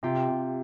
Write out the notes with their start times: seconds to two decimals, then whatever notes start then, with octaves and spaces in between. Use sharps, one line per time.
0.03 C3 F4 G4
0.28 C3